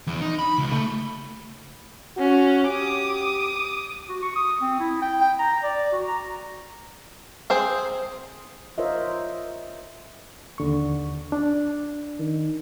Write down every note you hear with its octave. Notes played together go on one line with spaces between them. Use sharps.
E2
D#4
B5
C#2
A3
C#4 F#4
G4 D6 D#6
F#4
C#6
D#6
C4
E4
G5
G5
A#5
D5
F#4
A#5
C4 G#4 C5
F4 A#4 C5 C#5 D#5 E5
D#2 D3 C#6
D4
D#3